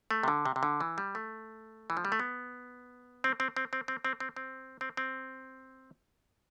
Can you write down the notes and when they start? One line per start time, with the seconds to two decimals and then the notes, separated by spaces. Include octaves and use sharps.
0.11 A3
0.23 C3
0.28 D3
0.46 C3
0.56 C3
0.63 D3
0.81 E3
0.98 G3
1.15 A3
1.90 E3
1.97 F3
2.05 G3
2.12 A3
2.20 B3
3.24 C4
3.40 C4
3.56 C4
3.73 C4
3.88 C4
4.05 C4
4.20 C4
4.36 C4
4.81 C4
4.97 C4